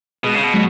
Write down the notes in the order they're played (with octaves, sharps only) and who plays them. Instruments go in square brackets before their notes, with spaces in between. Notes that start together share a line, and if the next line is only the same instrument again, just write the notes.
[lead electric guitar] B2 [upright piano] G#3
[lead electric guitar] C#3
B2
[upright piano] F#3